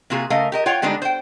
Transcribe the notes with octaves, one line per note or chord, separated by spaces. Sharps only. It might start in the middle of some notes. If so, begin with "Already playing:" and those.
C3 A#3 F4 F#4 G#4
C#3 A3 A#4 D#5 F5
G4 A#4 D#5
F4 C#5 F#5 G5
D3 G3 G#3 B3 D4 D#4
C5 G5